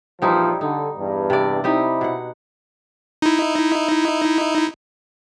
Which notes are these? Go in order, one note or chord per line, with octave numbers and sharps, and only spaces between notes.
A#1 E3 F3 G3 D#4 E4
D3 D#4
E2 G2
C3 D5
C4 D#4 E4 G4 D#5
B2 F#5
D#4 E4